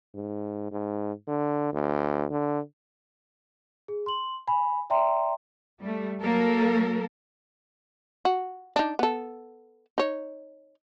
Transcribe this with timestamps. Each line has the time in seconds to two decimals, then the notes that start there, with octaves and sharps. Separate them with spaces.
0.15 G#2
0.72 G#2
1.28 D3
1.73 D2
2.31 D3
3.88 G#4
4.06 C6 F#7
4.47 G#5 B5
4.90 D5 E5 G5 A#5 C6
5.80 G3 A3
6.22 F#3 A#3 A4 A#4
8.25 F#4
8.76 D4 D#4
8.99 B3 A4
9.98 D#4 C#5